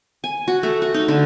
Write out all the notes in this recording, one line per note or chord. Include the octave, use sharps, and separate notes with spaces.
G#5
F#4
A3
F#4
D#4
D3